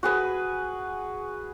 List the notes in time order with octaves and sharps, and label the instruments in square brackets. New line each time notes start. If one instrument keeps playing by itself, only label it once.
[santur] F#4 G#4 B4